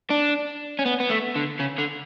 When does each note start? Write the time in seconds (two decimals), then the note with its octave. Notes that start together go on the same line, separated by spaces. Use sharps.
0.10 D4
0.79 C#4
0.85 B3
1.00 B3
1.09 A3
1.35 D3
1.59 C#3
1.78 D3